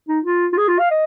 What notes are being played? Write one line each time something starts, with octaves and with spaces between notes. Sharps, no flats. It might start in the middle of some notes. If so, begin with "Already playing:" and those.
D#4
F4
F4
G#4
F4
F5
D#5